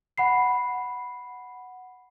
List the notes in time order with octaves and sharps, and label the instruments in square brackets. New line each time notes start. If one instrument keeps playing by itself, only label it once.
[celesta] F#5 B5 C7